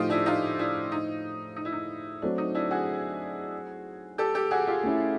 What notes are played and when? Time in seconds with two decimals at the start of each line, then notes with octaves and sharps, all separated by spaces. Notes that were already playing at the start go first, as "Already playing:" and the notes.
Already playing: A2 F3 A3 D#4 F4 G4
0.10 D4 E4
0.26 D#4 F4
0.59 D4 E4
0.92 D#4
1.56 D#4
1.65 E4
1.72 D#4
2.22 F#3 A3 C4 D4
2.38 D#4
2.55 D4 E4
2.71 F#4 G#4
4.18 G4 A4
4.35 G4 A4
4.51 F#4 G#4
4.67 F4 G4
4.83 A3 C#4 E4